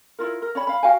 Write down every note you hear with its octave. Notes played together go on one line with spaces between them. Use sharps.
E4 F4 A#4
A#4
C#4 C#5 B5
F5 B5
F#4 F5 G5 G#5